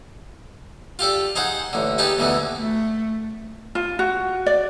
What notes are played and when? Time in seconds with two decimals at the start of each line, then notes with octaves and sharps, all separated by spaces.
0.99 F4 G4 A4 D5
1.36 D#4 G#4 C5 F#5
1.73 A1 D3
1.98 D#4 G4 G#4 B4 A5
2.18 D2 B2 D3 E3
2.59 A3
3.75 F4
3.99 F#4
4.46 D5